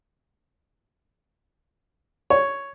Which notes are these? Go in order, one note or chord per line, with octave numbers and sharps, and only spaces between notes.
C#5